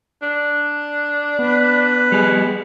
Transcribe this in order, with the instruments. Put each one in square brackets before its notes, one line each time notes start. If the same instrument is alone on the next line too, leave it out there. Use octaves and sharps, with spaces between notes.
[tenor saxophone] D4
[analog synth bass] B3 [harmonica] B4
[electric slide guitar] G3 G#4